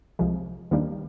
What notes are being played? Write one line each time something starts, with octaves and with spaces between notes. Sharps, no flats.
C2 C3 F3 G#3
D#2 D#3 G3 A#3 D4